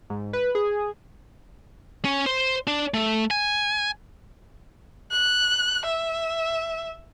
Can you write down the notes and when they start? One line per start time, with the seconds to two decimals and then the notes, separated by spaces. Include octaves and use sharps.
0.10 G#2
0.33 B4
0.55 G#4
2.05 C#4
2.26 C5
2.67 D4
2.94 A3
3.31 G#5
5.11 F#6
5.85 E5